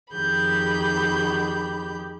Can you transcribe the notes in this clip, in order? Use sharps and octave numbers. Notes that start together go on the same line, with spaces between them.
F2 D#3 G4 G#4 B5 G6